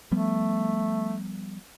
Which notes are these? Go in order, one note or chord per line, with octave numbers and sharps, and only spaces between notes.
F3 G3 A3 B3